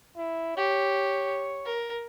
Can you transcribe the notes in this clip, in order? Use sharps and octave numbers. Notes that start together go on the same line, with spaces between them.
E4
G4 C#5
A#4